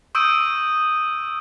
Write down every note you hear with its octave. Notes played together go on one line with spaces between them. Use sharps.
C#6 D#6 E6 G6 D7 D#7